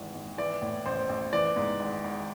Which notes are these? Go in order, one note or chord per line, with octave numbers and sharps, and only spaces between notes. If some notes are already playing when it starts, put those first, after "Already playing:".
Already playing: G#1 G#2 E3
G#1
E3 D5
A2
A1 C5
A1
E3 D5
G#2
G#1
G#1